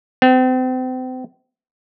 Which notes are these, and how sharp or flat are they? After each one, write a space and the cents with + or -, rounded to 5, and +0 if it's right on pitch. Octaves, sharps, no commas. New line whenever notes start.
C4 -35